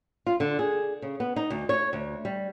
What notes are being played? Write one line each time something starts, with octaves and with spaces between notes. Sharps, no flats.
F4
D3
G#4
C#3
B3
D#4
D2
C#5
D2
G3